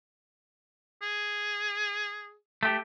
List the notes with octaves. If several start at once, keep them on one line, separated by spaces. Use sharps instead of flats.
G#4
A3 G4